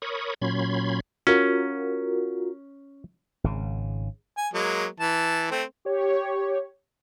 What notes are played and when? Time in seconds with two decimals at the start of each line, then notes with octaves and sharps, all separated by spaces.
0.02 A#4 C#5 B5 C#6 D#6
0.42 A#2 F#3 C#4 B5 C6 G#6
1.27 C#4 F4 F#4 A#4
3.44 G#1 C#3
4.37 G#5
4.54 F#3 G#3 A#3
5.00 E3 A5
5.51 A3 C4
5.85 G4 C#5